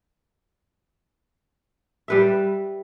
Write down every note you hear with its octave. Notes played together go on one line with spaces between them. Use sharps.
G3 B4 E5